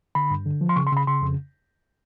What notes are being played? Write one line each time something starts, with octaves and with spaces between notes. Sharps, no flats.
D3 B5
G2
D3
F3
C6
C#3 C#6
C6
C#3 B5
C#3 C6
F2